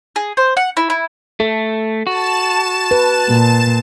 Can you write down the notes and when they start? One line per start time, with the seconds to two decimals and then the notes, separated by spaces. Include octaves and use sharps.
0.16 G#4
0.37 C5
0.57 F#5
0.77 E4
0.90 E4
1.40 A3 A4
2.07 F#4 A5 E7
2.91 B4
3.28 A#2